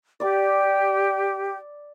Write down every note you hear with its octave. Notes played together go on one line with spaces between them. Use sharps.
G4 D5 D6